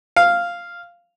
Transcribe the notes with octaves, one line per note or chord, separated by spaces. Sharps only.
F5